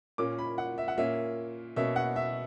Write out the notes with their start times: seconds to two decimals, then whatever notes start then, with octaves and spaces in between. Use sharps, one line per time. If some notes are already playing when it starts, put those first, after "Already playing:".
0.18 A#2 A#3 C#4 D6
0.39 B5
0.58 F#5
0.78 E5
0.88 F#5
0.97 A#2 A#3 C#4 E5
1.76 B2 A#3 C#4 E5
1.96 F#5
2.16 E5